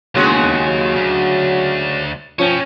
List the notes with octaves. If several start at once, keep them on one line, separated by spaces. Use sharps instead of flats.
E1 D#2 C#3 G#3 F#4
F#3
D2
F3 C#4 C#5 G5